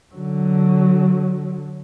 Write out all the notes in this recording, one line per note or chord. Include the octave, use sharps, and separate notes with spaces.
D3 F#3